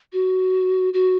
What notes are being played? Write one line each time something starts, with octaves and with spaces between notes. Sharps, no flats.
F#4
F#4